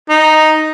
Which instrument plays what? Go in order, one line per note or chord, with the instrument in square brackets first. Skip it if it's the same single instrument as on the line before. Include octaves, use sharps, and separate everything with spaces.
[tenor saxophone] D#4